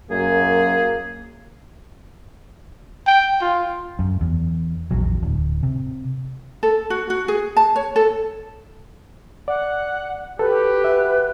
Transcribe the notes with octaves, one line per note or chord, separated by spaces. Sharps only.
F#2 A#3 G#4
G5
F4
F#2
E2
A#1 E2 F#3
D1
C3
A4
F#4
F#4
G#4
A5
C#5
A4
D5 F#5
F#4 G4 A4 B4
E5